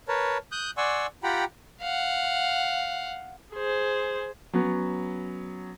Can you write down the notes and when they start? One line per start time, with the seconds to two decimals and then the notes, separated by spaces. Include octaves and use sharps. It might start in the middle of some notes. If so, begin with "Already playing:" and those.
0.08 A#4 B4 C#5 A5
0.52 D#6 F#6 G6
0.77 D5 F#5 G#5 C6 C#6 E6
1.23 F4 G4 F#5 G5 A#5 B5
1.81 F5 F#5
3.53 G#4 C5
4.53 F#3 B3 C#4